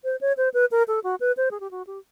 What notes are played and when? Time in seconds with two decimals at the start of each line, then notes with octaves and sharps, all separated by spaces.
0.04 C5
0.21 C#5
0.37 C5
0.54 B4
0.71 A#4
0.88 A4
1.04 F#4
1.20 B4
1.37 C5
1.51 G#4
1.60 G4
1.71 F#4
1.87 G4